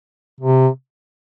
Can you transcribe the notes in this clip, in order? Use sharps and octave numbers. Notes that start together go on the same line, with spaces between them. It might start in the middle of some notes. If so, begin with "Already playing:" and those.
C3